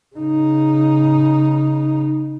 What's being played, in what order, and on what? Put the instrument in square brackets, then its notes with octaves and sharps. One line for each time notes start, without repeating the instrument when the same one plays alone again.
[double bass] C#3 D#4